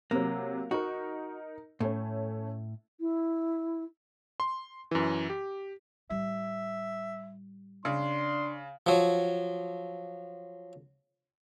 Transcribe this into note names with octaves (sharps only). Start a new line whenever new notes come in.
C3 F#3 A#3
D#4 F#4 A#4
A2 A3 C#4
E4
C6
F#2 E3
G4
A2 G3 E5
C#3 D4 C6
F3 F#3